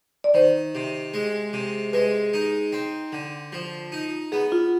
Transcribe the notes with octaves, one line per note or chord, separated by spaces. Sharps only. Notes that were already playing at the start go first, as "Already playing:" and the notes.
D5
D#3 C5
C3
G#3
C3
G#3 B4
D#4
C4
D3
F3
D#4
B3 G#4
F4